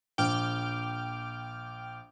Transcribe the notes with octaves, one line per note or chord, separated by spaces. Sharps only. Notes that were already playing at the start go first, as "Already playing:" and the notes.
A#1 G5 D6 F6